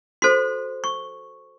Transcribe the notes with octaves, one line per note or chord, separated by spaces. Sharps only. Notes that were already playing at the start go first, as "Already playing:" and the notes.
F#4 A4 C5 C6
C#6